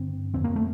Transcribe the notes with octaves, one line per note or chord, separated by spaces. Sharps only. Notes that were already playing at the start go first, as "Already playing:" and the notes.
Already playing: G2 D3 C4
F2 D3 C4
A#3
A3